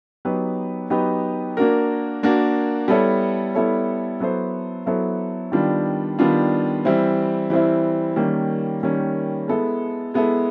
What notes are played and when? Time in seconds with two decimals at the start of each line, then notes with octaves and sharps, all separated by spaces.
0.25 F#3 B3 D#4 G4 B4
0.90 F#3 B3 D#4 G4 B4
1.57 A#3 D4 F#4 A#4
2.23 A#3 D4 F#4 A#4
2.88 G3 B3 E4 A4 C#5
3.55 G3 B3 E4 A4 C#5
4.20 F#3 B3 E4 A4 C5
4.86 F#3 B3 E4 A4 C5
5.52 D#3 G3 B3 D4 F4
6.19 D#3 G3 B3 D4 F4
6.85 E3 G3 C4 E4
7.50 E3 G3 C4 E4
8.16 D#3 G3 A#3 C#4
8.83 D#3 G3 A#3 C#4
9.48 G#3 B3 E4 A4
10.14 G#3 B3 E4 A4